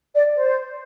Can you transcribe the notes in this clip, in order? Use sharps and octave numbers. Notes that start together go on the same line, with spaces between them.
D5
C5